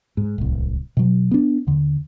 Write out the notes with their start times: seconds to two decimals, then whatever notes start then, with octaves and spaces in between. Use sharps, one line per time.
0.17 G#2
0.38 D1 C2
0.97 B2 F#3
1.31 B3 D4
1.67 D#2 D3